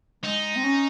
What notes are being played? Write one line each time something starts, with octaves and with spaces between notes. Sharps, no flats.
G#3 D#4
C4
C#4